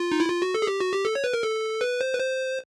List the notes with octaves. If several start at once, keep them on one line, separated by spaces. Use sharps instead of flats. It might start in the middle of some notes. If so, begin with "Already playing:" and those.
Already playing: F4
D#4
E4
F4
F#4
A4
G#4
G4
F#4
G4
A4
C#5
B4
A#4
A4
B4
C5
B4
C5